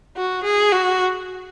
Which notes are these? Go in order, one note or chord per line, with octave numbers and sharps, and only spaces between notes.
F#4
G#4
F#4